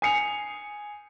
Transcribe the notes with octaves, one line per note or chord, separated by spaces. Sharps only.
G#5 D#6 C7 C#7 F7